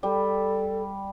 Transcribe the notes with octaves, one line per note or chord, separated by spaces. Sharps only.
G3 A4